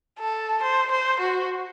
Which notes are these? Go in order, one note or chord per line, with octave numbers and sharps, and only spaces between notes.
A4
C5
C5
F#4